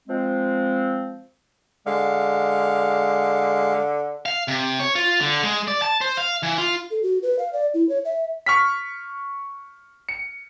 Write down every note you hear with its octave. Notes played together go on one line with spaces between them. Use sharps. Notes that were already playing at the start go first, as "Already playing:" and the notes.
F3 G#3 C4
D3 G#3 F5
F5
C3
C#5
F4
D3
G#3
D5
A5
C5
F5
E3
F4
A4
F#4
B4
F5
D5
E4
C#5
E5
C#6 F6 B6
C#7